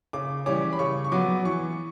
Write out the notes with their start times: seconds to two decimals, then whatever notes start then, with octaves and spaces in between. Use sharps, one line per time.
0.13 C#3 D6
0.46 E3 G3 C#4 D6
0.73 B5
0.79 C#3 C#6
1.04 C#6
1.12 F#3 B3 D6
1.45 E3 C#6